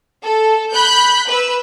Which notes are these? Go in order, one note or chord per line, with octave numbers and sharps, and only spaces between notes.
A4
B5 F#6 G6
B4 E6